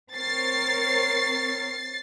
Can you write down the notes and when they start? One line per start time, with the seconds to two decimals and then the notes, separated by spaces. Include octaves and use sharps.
0.14 C4 A#4 C#5 A6 C7